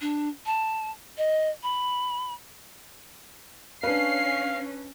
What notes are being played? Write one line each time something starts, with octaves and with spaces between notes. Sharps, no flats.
D4
A5
D#5
B5
C#4 D4 B4 F5 C7